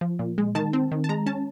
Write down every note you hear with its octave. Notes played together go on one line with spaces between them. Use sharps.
F3
A#2
G#3
D#3 A5
C4
D#3
A5
G#3 A#5
C#4 A5